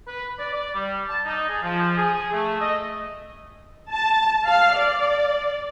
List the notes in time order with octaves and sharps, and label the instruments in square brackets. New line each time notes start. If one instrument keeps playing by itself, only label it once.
[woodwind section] B4
D5
D5
G3
A5
D#4
G#4
F3
G#4
A3
D#5
[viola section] A5
F5
D5